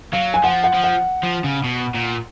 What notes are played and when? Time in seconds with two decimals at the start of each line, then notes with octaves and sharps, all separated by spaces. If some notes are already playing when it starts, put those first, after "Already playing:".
0.13 F#3 F5
0.34 G#5
0.43 F3 F#5
0.64 F#5
0.74 F3
0.84 F#5
1.23 F3
1.44 C#3
1.64 B2
1.94 A#2